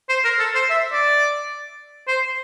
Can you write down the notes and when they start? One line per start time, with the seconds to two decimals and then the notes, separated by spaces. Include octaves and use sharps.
0.09 C5
0.24 A#4
0.39 A4
0.55 C5
0.70 E5
0.93 D5
2.08 C5